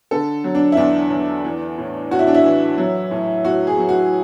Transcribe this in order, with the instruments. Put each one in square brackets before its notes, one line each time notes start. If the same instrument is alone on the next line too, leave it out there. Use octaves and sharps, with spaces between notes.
[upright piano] D3 A4
F#3
D4
E4
E2 D4
E2
E3
A2
A2 F#4
E4
D4
E4
E3
F#3
A2
A2 F#4
G#4
F#3
F#4